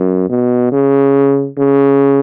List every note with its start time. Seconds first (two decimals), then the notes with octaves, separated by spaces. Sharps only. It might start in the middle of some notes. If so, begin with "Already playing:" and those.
Already playing: F#2
0.30 B2
0.72 C#3
1.58 C#3